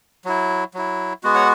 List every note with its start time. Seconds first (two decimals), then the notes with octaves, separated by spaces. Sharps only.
0.25 F#3 E4
0.74 F#3 E4
1.23 G#3 B3 F#4
1.35 C#5 F#5